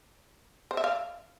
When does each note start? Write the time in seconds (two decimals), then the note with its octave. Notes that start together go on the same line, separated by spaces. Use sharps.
0.71 C5
0.77 E5
0.84 F5